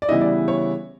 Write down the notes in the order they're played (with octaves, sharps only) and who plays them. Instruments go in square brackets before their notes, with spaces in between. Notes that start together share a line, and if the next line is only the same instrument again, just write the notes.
[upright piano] D5
C#3 E3 G3 B3 E4 D#5
D5
C#5